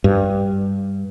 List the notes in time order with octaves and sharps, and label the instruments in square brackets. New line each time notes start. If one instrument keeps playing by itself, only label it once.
[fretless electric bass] G2